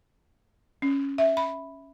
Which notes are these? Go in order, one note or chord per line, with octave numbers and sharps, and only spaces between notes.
C#4
E5
B5